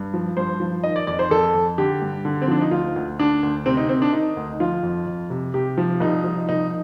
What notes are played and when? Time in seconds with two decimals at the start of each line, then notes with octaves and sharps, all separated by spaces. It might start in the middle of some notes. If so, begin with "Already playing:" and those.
Already playing: G2
0.14 F3
0.37 G2 C5
0.60 F3
0.83 D#3 D#5
0.96 D5
1.07 F2 D5
1.19 C5
1.30 F2 A4
1.54 F2
1.78 D3 G4
2.02 G2
2.25 D3
2.42 C4
2.48 F3 D4
2.61 D#4
2.71 D2 F4
2.96 D2
3.19 D2 D4
3.43 D2
3.66 C3 C4
3.77 D#4
3.89 D#3 C4
4.02 D4
4.13 D#3 D#4
4.37 D2
4.60 F3 F4
4.83 F2
5.06 F2
5.30 C3
5.54 C3 G4
5.78 F3
6.00 C2 D#4
6.24 F3
6.49 C2 D#4